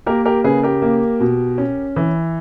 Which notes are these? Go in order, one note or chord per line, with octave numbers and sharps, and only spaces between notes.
A#3 G4 A#4
G4 A#4
C#3 G#4 B4
G4 A#4
A#3
B2
C#4
E3